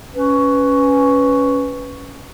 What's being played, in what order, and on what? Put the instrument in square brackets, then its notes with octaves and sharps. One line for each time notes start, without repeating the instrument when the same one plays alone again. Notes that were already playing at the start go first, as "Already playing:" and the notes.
[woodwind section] C#4 B4